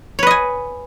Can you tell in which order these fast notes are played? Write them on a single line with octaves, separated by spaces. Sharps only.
C#5 B4 D#5 G#5